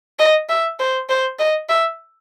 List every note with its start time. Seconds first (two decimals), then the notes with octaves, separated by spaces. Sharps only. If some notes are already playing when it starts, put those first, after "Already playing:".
0.19 D#5
0.49 E5
0.79 C5
1.09 C5
1.39 D#5
1.69 E5